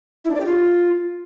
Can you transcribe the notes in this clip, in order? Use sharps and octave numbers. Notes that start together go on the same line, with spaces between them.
E4
D4
D5
G4
F4